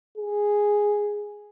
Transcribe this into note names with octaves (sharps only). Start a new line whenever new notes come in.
G#4